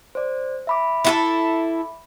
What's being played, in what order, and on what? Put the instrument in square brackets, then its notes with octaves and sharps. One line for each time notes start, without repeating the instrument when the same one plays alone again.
[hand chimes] C5 D5
E5 B5 D6
[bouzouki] E4 F#4 A4